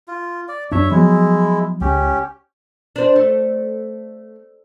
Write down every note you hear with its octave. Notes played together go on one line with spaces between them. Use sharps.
F4
D5
F#2 D4 C#5 E5
F3 F#3 G#3 B3 E4
C#2 C#4 G4
D4 C5
A3